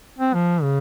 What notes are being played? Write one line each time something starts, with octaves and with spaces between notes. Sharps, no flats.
C4
F3
C#3